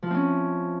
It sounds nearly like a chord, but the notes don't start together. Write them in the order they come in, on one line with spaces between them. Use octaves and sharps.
F3 E4 C4 C#4